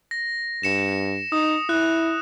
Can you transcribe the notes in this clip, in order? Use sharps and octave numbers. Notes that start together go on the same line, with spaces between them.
A#6
G2 C#7 E7
D#4 D#6
E4 F#6